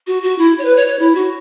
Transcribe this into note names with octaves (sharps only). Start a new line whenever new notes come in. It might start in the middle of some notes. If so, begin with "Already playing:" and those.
F#4
F#4
E4
C#5
B4
C#5
C#5
E4
F#4